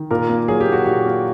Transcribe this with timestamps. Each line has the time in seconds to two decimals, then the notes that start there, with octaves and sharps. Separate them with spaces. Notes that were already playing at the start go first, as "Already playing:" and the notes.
Already playing: D#3
0.11 A#2 A#4
0.29 A#3
0.48 F#3 G#4
0.60 G4
0.67 A#2
0.73 F#4
0.84 A#2 G4
1.05 A#3